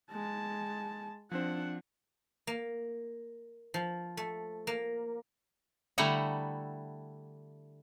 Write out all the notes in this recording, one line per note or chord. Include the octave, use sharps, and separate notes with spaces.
G#3 A5
F3 C4 D4 C5 F#5
A#3
F3
A3
A#3
D3 G3 A3 E4 F#5 A#5